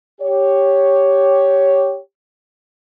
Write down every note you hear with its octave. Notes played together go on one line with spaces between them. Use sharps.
G4 C#5